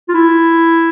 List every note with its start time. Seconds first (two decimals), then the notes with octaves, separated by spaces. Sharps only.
0.09 F4
0.14 E4